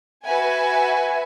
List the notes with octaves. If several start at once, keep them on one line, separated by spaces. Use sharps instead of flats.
F#4 B4 E5 G#5